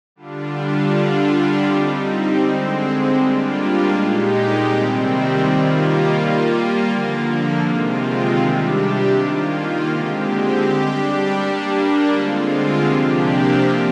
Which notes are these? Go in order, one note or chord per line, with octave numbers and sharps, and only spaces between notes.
D3 G3 D4 F4
D3 G3 D4 F4
G3 C4 D#4
D3 G#3 C4
G3 A#3 D4 F4
A#2 G#3 D#4 G4
C3 D#3 G3 C4
D#3 G3 A#3 F4
G3 A#3 F4
D3 F3 A#3
C3 D#3 G#3 C4 F4
C3 G3 D4 G4
D#3 A#3 F4
D3 G#3 C4 G4
G3 D4 G4
G3 A#3 D4
D3 G#3 C4 F4
C3 F3 A#3 D4 G4
F3 C4 F4